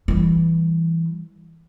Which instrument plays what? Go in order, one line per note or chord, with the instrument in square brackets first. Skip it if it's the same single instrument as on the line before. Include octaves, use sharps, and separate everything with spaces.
[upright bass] E3 G3